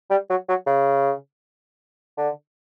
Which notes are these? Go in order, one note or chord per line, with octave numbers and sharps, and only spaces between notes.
G3
F#3
F#3
C#3
D3